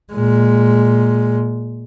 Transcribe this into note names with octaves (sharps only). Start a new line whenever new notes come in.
A#2 G#3